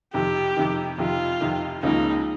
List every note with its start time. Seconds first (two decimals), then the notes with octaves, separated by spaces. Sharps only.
0.14 F2 C3 D#3 G4
0.57 F2 C3 D#3
0.98 F2 C3 D#3 F4
1.40 F2 C3 D#3
1.83 C#2 C#3 F3 A#3 C#4 D#4